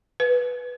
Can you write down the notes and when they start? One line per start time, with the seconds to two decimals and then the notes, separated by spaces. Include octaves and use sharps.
0.20 B4